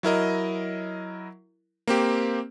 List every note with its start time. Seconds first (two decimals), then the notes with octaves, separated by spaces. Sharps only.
0.03 F#3 E4 A#4 D#5
1.87 A#3 C4 G4